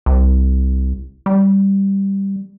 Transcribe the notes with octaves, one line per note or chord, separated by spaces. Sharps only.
C2
G3